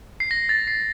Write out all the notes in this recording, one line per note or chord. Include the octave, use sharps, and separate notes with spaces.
C7
A#6
A6
C7